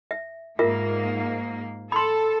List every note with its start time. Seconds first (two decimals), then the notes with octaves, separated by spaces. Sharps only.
0.11 E5
0.59 G#2 A#3 F4 A#4 E5
1.92 A4 B5 C6